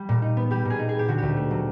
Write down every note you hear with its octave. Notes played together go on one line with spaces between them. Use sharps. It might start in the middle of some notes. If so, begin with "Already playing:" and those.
Already playing: G3
A#2
D#4
B3
G3 G4
A#2 G#4
D#4
G#4
B3 G4
D3 F#4
D2 G4
A3
F#3